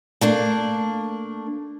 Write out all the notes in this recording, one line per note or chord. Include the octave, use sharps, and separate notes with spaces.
A3 A#3 D4